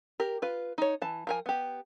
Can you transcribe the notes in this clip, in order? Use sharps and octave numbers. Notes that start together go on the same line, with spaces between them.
G4 A#4
F4 B4
D#4 C#5
E3 A5
F3 A#4 G#5
B3 G4